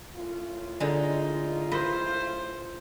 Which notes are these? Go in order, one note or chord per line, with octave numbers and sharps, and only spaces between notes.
F#2 A2 F4
D3 G#3 D#4
B4 C5 D#5